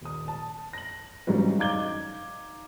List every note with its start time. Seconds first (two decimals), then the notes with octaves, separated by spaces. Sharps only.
0.01 D#1 D#6
0.28 A5
0.73 A#6 F#7
1.27 G#2 C#3 E3 F#3 G3
1.58 D#4 F5 D6 G#6 G7